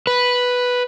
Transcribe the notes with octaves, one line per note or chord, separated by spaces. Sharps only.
B4